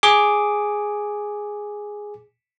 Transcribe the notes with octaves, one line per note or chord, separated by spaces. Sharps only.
G#4 D6